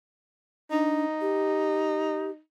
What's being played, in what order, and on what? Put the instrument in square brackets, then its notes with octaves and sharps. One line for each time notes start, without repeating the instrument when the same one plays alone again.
[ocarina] D4 [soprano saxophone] D#4
[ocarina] G4